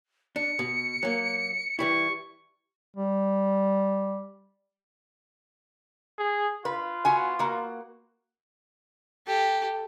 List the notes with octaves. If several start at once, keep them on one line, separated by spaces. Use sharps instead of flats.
D4 C#7
B2
F#3 A#3
E3 G3 E4 C#6
G3
G#4
F4 B4
B3 F#4 G#5
A#3 F#4
G4 A4